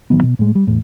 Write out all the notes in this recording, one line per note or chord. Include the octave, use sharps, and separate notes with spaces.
A1 D#3 F#3 B3
B2
A2 G#3
G3
E2 A2